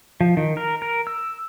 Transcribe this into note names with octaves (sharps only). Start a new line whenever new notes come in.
F3
D#3
A#4
A#4
E6